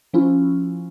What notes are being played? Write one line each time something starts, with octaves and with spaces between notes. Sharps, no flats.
F3 C#4 E4 F4